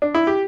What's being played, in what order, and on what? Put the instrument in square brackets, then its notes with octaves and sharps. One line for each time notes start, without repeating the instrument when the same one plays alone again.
[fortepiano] D4
E4
G4